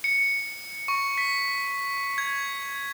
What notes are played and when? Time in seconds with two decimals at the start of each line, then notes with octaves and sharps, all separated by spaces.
0.04 C#7
0.88 C#6
1.18 B6
2.18 G#6